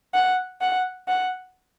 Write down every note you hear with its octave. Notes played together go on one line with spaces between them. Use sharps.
F#5
F#5
F#5